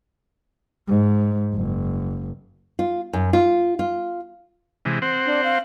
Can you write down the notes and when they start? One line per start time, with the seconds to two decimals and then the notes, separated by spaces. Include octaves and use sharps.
0.88 G#2
1.54 F#1
2.79 F4
3.13 F#2
3.33 F4
3.79 F4
4.85 C3 E3 G#3
5.02 C4 C5 F#5
5.26 D4
5.44 F5